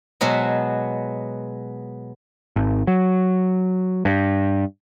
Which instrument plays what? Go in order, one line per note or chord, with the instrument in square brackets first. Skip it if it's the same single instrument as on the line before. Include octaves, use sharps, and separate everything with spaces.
[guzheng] B2 F#3 G#3 B3
[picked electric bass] G#1
F#3
G2